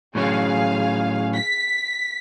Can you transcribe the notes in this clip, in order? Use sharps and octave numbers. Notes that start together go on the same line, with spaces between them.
A2 F#3 C#4 G#4 F5
B6